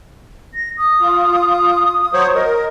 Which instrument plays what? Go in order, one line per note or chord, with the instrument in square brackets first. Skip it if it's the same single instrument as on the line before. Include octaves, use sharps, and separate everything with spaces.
[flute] A#6
D#6
[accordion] F4
F#3 C5 C#5
[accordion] A#4 [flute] D#5